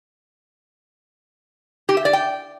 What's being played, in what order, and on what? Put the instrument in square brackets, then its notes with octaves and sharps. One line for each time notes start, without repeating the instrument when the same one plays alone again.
[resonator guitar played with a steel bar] G4
E5
D5
G5